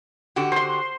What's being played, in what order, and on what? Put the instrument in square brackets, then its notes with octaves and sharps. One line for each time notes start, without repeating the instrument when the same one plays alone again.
[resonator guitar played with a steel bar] D3 F#4 G4
[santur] C5 C6